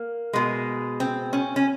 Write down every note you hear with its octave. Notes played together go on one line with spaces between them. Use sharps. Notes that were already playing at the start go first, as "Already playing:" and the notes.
Already playing: A#3
B2 G#3
C4
C#4
C#4